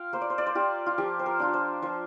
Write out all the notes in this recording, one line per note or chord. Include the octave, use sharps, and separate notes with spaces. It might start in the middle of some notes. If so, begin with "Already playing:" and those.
Already playing: F4 F5 G5
A#3 C5
D5
C5
D5
C5
F4 G4
F4
F3 G4
C5
A#4
D4 F4
C5
F3 C5